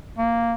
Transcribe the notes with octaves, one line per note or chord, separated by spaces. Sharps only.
A#3